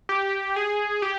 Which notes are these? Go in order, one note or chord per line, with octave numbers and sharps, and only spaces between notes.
G4
G#4
G4